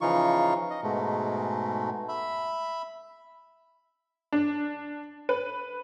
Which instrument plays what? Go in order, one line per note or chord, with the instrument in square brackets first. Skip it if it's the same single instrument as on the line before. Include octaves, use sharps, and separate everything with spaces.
[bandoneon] C#3 E3 F3 D#4 F4 C#6
D#5
G#2 B2 G#3 A3
E5 B5
[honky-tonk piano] D4
B4